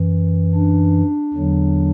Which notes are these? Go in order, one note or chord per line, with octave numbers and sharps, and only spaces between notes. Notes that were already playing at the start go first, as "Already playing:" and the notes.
Already playing: F#2 E3
D4
E2 D3 F#3